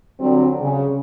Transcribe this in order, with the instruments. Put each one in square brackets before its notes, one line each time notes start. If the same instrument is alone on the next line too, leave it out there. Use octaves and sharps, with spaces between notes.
[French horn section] D3 F#3 G3 C4
C#3